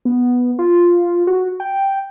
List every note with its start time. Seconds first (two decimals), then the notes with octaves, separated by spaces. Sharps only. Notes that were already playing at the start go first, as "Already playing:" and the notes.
0.05 B3
0.59 F4
1.27 F#4
1.60 G5